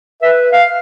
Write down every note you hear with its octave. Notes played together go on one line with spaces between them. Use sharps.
B4 E5
F5